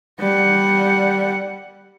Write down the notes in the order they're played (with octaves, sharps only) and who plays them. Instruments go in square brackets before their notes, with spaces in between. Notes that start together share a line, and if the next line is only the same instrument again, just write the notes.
[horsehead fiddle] G3 F#5